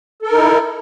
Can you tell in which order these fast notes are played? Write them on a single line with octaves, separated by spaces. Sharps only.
A4 A#4 D#4 E4